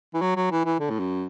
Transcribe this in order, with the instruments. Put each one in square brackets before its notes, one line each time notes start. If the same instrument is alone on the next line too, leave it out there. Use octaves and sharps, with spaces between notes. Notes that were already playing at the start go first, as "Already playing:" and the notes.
[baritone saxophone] E3
F#3
F#3
E3
E3
D3
A2
F#2